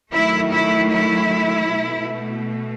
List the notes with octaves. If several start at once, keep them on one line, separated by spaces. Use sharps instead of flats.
D#3 F#3 A3 E4
E4
E4
B2 A3